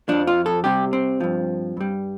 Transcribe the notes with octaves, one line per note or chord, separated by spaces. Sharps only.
F2 F3 D4
F4
A4
C2 C3 G3 G4
C4
G2 F3
G2 G3